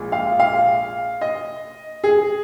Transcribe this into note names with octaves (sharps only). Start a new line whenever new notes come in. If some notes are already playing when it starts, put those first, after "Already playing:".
Already playing: A#1 A#2 G#3
F5
F5
D#5
G#4